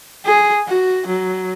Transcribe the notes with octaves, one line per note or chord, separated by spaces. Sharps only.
G#4
F#4
F#3